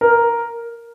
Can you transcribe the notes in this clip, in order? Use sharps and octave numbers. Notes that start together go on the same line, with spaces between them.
A#4